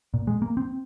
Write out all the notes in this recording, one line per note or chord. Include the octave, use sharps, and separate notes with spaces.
A#2
G#3
A#3
C4